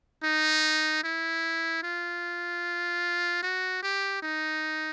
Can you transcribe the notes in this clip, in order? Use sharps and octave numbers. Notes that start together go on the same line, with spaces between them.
D#4
E4
F4
F#4
G4
D#4